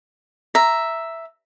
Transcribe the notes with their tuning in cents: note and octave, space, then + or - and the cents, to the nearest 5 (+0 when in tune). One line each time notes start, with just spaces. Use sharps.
E5 +0 A#5 +0